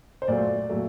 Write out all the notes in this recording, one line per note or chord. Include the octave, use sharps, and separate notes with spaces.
C5
A#2 F#3 A3 D5
A#2 F#3 A3